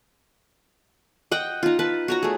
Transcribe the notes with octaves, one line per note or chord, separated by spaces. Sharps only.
D#5 F#5 G5
D#4 F4
B4 A5
F#4 C#5 A#5
A3 G#4